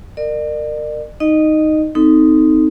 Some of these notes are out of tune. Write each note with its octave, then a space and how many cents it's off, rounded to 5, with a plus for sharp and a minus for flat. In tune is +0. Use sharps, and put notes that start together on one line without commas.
A#4 -20 D5 +40
D#4 +0 D#5 -20
C4 -25 D#4 +0 A4 +0